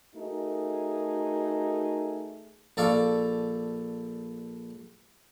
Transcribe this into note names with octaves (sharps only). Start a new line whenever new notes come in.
A3 D#4 F#4 G#4 A#4
A#1 A4 D5 F5 C#6